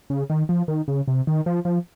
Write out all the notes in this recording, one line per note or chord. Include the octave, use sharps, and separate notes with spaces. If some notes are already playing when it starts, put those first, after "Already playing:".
C#3
D#3
F3
D#3
C#3
C3
D#3
F3
F3